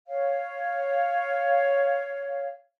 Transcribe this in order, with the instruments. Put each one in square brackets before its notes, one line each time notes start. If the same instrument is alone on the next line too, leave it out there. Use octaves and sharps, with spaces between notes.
[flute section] C#5 F5